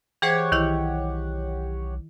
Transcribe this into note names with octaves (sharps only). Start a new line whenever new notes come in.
E3 G4 G#4 C5 C#5 F#5
B1 D#3 E4 G6